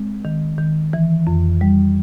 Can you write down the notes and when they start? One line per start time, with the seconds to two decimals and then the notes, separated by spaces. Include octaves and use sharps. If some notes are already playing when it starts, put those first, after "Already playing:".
Already playing: G#3 C4
0.25 D#3
0.58 D#3
0.93 E3
1.27 F2
1.61 G3